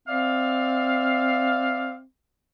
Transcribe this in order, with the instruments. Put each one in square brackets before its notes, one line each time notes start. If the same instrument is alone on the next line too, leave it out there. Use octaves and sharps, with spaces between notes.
[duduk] C4 [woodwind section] D5 E5 F5